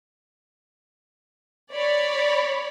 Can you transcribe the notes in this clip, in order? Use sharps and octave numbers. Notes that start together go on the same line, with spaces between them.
C#5 D5 B5